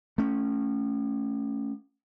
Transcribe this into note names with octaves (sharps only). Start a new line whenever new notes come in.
A3 C#4